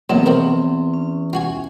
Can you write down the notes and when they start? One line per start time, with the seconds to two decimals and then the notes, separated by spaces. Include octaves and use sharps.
0.10 E2 A#2 D#3 F#3 C4
0.26 B2 F3 A#4
0.94 C#4
1.33 F4 F#4 G#5